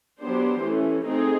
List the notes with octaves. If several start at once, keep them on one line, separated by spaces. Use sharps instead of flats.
F#3 B3 D4 G4 C5
E3 A3 C#4
A3 C4 D#4 G#4